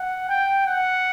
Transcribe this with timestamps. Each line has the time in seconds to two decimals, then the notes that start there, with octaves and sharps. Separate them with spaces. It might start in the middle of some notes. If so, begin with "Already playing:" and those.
Already playing: F#5
0.29 G5
0.67 F#5